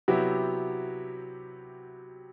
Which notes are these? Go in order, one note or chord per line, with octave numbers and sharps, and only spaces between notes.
C3 F#3 B3 E4 G4